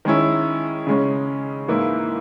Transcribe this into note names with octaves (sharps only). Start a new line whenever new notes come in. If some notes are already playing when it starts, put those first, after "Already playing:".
D#3 G#3 C#4 E4
C#3 G#3 C#4
G#2 E3 A#3 E4